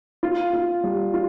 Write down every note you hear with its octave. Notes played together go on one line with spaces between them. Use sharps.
F4
F4
G3
F4